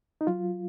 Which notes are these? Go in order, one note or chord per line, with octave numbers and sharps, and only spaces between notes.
D#4
F#3 F4